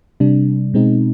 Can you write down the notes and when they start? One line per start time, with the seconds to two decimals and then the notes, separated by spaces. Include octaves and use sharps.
0.20 C3 G3 D4
0.74 B2 G#3 C4 D#4